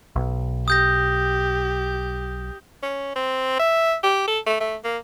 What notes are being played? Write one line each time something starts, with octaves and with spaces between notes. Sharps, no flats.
B1
G4 D#6 G6 A#6
C#4
C4
E5
G4
A4
A3
A3
A#3